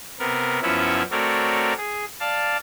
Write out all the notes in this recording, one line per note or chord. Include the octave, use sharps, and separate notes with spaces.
C3 B3 A#4
F#2 F3 B3 C#4 E4 E5
A3 C4 F#4 A#4 C#5 D5
G#4
D5 F5 A5